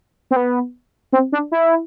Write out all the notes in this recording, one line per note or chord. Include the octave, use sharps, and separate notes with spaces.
C4
B3
C4
D4
E4